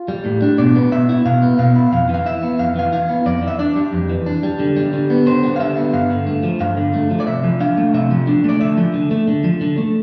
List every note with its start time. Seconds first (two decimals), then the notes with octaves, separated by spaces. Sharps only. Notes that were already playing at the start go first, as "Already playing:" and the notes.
Already playing: F4
0.08 G3
0.25 A2
0.42 D4
0.58 B2 D5
0.75 B3
0.92 B2 E5
1.09 E4
1.25 B2 F5
1.42 B3
1.59 B2 F5
1.76 E4
1.93 F2 F5
2.09 E3
2.14 F5
2.26 E4 E5
2.43 B3
2.59 F2 F5
2.76 E3 F5
2.92 E4 F5
3.09 B3
3.26 F2 D5
3.42 E3
3.47 E5
3.59 D4 D5
3.76 G3
3.93 F2
4.09 E3
4.26 D4
4.43 G3
4.60 D3
4.76 G3
4.93 D3
5.10 B3
5.26 D3 C5
5.43 G3
5.56 F5
5.60 D3 E5
5.77 B3
5.93 G2 F5
6.10 D3
6.27 A3
6.43 F3
6.60 G2 F5
6.77 D3
6.94 A3
7.11 F3
7.20 D5
7.27 C3 E5
7.44 F3
7.60 D4 F5
7.77 A3
7.94 C3 E5
8.11 F3
8.27 D4
8.44 A3 D5
8.61 D3 E5
8.77 F3
8.94 D3
9.11 A3
9.28 D3
9.44 F3
9.61 D3
9.78 A3